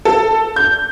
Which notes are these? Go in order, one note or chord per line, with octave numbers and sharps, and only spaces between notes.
A4
G6